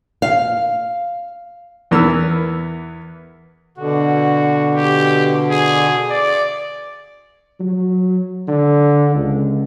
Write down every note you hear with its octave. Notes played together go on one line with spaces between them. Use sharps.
F5
E2 E3 B3 A#4 E6
B2 D3 F#4
G4
G#4
D5
F#3
D3
C#2